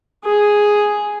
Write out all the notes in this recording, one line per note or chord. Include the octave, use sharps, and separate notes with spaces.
G#4